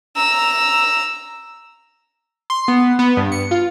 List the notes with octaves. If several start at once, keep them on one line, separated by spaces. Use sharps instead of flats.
A#5 E6
C6
B3
B3
G2
C#7
F4